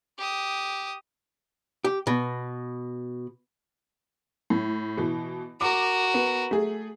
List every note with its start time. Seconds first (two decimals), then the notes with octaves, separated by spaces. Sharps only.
0.18 G4 D#6
1.85 G4
2.07 B2
4.50 A2
4.97 B2 E3
5.61 F#4 A#4 D6
6.14 B3
6.51 A3 G#4